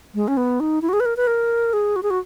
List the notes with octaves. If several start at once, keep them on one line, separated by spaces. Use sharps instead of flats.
G#3
C#4
B3
D#4
E4
F#4
G#4
B4
A#4
B4
A#4
G#4
F#4
G#4
F#4